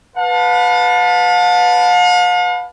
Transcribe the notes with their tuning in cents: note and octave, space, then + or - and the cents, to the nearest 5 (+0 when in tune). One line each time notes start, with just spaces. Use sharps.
B4 +0 F5 +45 A5 +0